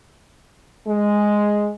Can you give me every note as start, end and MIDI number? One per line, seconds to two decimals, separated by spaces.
0.87 1.70 56